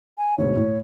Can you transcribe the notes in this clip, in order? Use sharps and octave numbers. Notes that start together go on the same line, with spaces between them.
G#5
D2 G#2 B2 C#5
A2